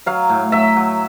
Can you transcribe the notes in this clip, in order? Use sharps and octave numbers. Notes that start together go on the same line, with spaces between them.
F#3 F5
A2
F#3 E5
F#3